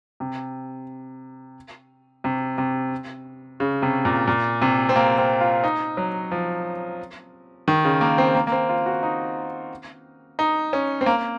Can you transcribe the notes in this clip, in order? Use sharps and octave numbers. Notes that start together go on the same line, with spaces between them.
C3
C3
C3
C#3
C3
A#2
A#2
C3
C4
A#3
C4
F4
D#4
F#3
F3
D#3
C#3
A#3
C4
A#3
A#3
C4
F4
F#4
D#4
D#4
C#4
C4
A#3